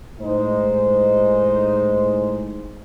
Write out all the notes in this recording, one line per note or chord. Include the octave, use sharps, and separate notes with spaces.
A2 G#3 D#4 C5